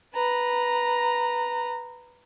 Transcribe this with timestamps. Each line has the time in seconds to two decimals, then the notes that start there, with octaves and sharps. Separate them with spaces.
0.14 B4 A#5